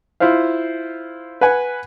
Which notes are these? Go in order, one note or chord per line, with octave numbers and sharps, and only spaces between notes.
E4 F4 C5 F5
B4 F#5 G#5